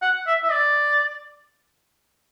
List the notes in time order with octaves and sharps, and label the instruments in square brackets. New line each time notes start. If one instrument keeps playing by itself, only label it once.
[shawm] F#5
E5
E5
D5